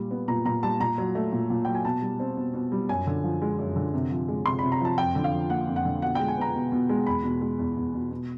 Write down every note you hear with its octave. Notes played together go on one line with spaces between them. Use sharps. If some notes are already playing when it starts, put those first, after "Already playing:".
Already playing: A#2 G3
B3
A#2 A#5
A#2 A#5
G3 A5
A#2 A#5
F#3
A3
A#2
A#2
F#3 G5
G#5
B2 A5
G3
C4
B2
B2
G3
F#2 G#5
D3
F3
G#3
F#2
D3
C3
F3
G#3
C3 C6
C3 B5
A#5
F3 A5
F2 G5
D3
F5
F3
A#3 F#5
F2
F#5
D3
B2 F#5
G#3 G5
G#5
B3 A#5
B2
B2
G#3
E2 B5
B2
G#3
E2
E2
B2
B2